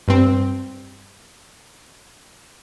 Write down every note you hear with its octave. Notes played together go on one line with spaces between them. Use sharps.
G2 C4